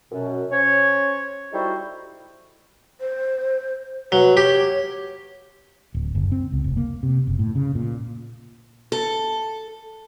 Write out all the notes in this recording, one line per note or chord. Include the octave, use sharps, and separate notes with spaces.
F#2 B2
C#4 C5 C#5
G3 D#4 E4 F#4 A4 C5
C5
F#3 B4
G4 C#5
D1
F#1
C4
C#2
F1
A#3
C3
F#1
A2
C#3
A#2
A4